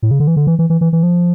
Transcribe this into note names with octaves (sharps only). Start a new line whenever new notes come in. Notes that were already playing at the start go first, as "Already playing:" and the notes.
A2
C#3
D3
E3
D3
E3
E3
E3
E3
E3
F3